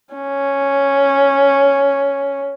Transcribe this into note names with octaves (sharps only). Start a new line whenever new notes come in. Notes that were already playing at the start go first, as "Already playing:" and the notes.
C#4